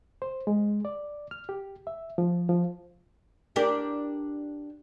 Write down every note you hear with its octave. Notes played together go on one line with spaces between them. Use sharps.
C5
G#3
D5
F6
G4
E5
F3
F3
D4 G4 A#4